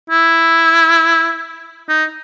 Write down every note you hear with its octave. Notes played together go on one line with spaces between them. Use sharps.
E4
D#4